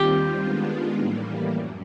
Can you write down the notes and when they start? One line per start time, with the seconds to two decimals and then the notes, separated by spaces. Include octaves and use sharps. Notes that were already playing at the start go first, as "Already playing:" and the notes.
Already playing: D#2 D#3 G3 C4 F4 G4
0.40 D#3 G#3 B3 D4 F4
0.96 A2 E3 G3 A#3
1.52 F#2